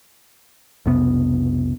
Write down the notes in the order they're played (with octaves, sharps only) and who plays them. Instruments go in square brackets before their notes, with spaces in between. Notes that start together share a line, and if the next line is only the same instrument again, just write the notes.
[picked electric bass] B1 F2 C3 B3